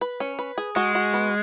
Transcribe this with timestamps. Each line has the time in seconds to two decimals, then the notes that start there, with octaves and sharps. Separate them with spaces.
0.01 B4
0.20 C#4
0.39 B4
0.58 G#4
0.76 G#3 F#4
0.95 F#4
1.14 B3